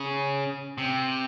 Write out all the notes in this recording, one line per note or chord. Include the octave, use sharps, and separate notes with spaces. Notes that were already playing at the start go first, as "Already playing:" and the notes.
Already playing: C#3
C3